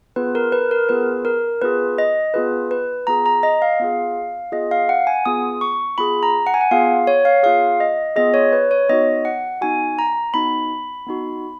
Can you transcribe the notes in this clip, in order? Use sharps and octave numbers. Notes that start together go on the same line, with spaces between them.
B3 F4 G#4 B4
A#4
B4
A#4
B3 F4 G#4 B4
A#4
B3 F4 G#4 B4
D#5
B3 F4 G#4 B4
B4
B3 F4 G#4 A#5
A#5
D#5
F5
B3 F4 G#4
B3 F4 G#4 D#5
F5
F#5
G#5
B3 F4 G#4 D#6
C#6
B3 F4 G#4 B5
A#5
F#5
G#5
F#5
B3 F4 G#4 F5
C#5
F5
B3 F4 G#4 F5
D#5
B3 F4 G#4 D#5
C#5
B4
C#5
B3 D#4 F#4 D#5
F#5
B3 D#4 F#4 G#5
A#5
B3 D#4 F#4 B5
B3 D#4 F#4